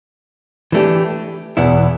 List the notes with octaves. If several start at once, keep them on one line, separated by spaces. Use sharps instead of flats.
E3 A3 D4 G4
E2 B2 B3 E4